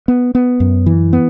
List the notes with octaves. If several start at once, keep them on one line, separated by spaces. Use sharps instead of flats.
B3
B3
F#2
E3
B3